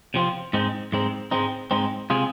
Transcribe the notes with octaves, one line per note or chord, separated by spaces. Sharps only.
C3 F3 C4 F4
G#2 G#3 C4 D#4
G#2 G#3 C4 D#4
G#2 G#3 C4 D#4
G#2 G#3 C4 D#4
C3 G#3 C4 F4 G#4